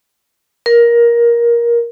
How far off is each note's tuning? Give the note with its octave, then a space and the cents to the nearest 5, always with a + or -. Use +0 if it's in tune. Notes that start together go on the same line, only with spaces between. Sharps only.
A#4 +15